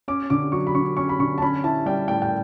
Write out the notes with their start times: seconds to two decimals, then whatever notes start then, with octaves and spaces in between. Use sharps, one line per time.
0.08 C#4 D6
0.30 D3 D6
0.52 F#3 C#6
0.67 B5
0.75 D3 C#6
0.97 C#4 C#6
1.09 B5
1.19 D3 C#6
1.38 A5
1.41 C#4 B5
1.64 E4 A5
1.86 G3 G5
2.08 A2 G5
2.22 G5